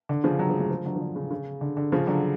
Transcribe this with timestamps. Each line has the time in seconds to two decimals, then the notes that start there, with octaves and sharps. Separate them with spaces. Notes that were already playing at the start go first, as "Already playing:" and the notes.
0.09 D3
0.24 C#3 F3
0.39 D3 F#3
0.49 F3 G#3
0.60 F#3 A3
0.70 F3 G#3
0.85 D3 F#3
0.96 F3
1.01 D3
1.16 C#3
1.31 C#3
1.61 D3
1.77 D3
1.92 C#3 F3
2.07 D3 F#3